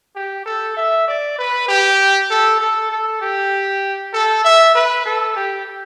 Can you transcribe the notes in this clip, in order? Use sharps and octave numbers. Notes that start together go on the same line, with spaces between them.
G4
A4
E5
D5
B4
G4
A4
A4
A4
G4
A4
E5
B4
A4
G4